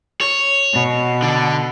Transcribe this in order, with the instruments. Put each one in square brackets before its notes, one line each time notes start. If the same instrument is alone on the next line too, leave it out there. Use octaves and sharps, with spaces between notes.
[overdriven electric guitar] C#5
[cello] B2
[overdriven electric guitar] D3